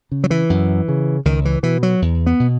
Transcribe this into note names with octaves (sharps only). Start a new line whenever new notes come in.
C#3
F#3
E3
F#2
C#3
C#2 D#3
E3
B2 E3
F#3
E2
B3
B2